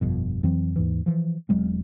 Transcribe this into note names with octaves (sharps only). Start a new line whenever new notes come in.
G1 F2 B2
F2 E3 F#3 C4
D#2 G#2 E3
E3 F3
E1 F#3 G#3 C4